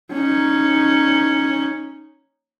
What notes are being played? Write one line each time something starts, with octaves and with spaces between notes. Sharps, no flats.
C#4 D#4